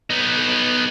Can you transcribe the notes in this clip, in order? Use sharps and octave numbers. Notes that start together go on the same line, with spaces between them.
B3 D#4